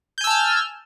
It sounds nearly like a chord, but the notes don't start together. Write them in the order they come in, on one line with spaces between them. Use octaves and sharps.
G6 G#5 E6 A5 F6